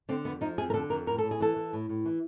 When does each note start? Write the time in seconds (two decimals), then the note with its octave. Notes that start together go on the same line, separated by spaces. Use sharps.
0.09 D3 C4
0.25 F2 B3
0.41 F3 D#4
0.58 F2 G#4
0.70 A#4
0.74 D3 A4
0.90 F2 A#4
1.06 A2 A#4
1.18 A4
1.23 A2
1.31 G#4
1.40 E3 A4
1.56 E3
1.73 A2
1.89 A2
2.05 E3